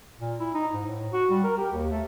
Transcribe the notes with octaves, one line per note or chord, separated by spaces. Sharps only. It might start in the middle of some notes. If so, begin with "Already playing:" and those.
A#2
E4
D#4
G#2
A2
F#4
G3
A#4
G4
D#2
A3